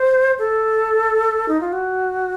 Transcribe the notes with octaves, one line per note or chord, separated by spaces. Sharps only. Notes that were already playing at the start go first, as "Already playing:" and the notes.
Already playing: C5
A4
D#4
F4
F#4